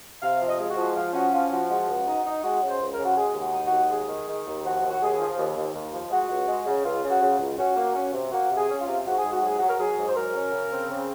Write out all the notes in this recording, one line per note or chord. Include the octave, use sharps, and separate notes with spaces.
C3 F5
F3
D#5
G#3
F#4
F3
F3 F4
C#4 F#4
F3 F4
F3 F#4
G#3 F#4
C#2
D#4
D#4
G#3 F#4
C#3
C5
C#2
A#4
C#3
F#4
G#3 G#4
D#2
F#4
D#4
F#4
D#2
G#3 G#4
D#3
D#3
D#2
F3 F#4
D#2
F#4
D#2 G#4
F3
D#2
D#2
D#2
F3
G#3 F#4
C#2
G#3
C#3
C#2 F4
C#3
F#4
C#3
C#2
C#4 F#4
A#3
C#4
C3
A#3 F#4
C3 G#4
C#4
F4
C3
G#2 F#4
G#4
G#2
F#4
F#3 G#4
F#3 F#4
A#4
F#3 G#4
G#2
C5
F#3 A#4
C#4
C#3
C4
C#3